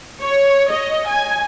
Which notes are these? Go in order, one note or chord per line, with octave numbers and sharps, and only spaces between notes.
C#5
D#5
G#5